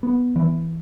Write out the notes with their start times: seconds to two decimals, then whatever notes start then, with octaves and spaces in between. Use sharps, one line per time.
0.03 B3
0.36 E3